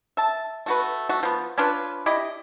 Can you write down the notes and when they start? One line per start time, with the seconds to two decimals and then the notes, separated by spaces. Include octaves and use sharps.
0.17 E5 A5
0.66 A3 F#4 B4
1.09 A3 F#4
1.23 F3 B3
1.58 C#4 D4 F4 B4
2.06 E4 G4 D5 D#5